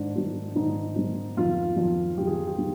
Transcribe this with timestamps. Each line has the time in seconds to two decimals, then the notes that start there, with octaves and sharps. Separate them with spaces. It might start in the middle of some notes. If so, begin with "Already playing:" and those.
Already playing: G#2 D#3 D4
0.16 G#2 D#3
0.56 G#2 D#3 D#4
0.96 G#2 D#3
1.37 F2 D#3 F4
1.77 F2 D#3
2.18 F2 D#3 G4
2.27 G#4
2.37 G4
2.47 G4
2.59 D#3